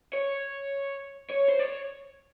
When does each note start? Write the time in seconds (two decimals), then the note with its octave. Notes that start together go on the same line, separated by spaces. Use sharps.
0.13 C#5
1.31 C#5
1.49 C5
1.60 C#5